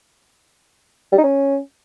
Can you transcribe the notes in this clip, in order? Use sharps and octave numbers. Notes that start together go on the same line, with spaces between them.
G3
D#4
C#4